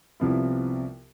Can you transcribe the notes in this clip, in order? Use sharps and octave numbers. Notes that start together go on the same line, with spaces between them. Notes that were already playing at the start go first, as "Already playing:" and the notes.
C2 C3 F3 B3 E4